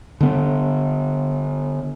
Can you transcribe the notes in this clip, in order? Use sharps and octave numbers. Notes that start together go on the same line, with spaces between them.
D3 B3